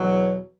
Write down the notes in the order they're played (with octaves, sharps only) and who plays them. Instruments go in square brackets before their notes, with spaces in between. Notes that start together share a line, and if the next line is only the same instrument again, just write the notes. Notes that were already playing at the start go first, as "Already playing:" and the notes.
Already playing: [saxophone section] E2 B2 F#3